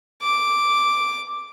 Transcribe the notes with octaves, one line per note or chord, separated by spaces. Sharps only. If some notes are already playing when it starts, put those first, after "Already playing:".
D6